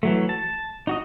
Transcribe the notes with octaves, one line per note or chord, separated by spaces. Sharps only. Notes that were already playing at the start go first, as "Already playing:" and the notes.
E3 F#3 A3
A5
D#4 F#4 D#5